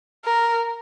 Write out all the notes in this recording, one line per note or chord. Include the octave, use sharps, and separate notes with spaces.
A#4